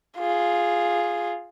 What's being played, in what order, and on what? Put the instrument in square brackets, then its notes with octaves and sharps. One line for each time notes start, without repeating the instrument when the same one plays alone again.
[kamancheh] F4 G#4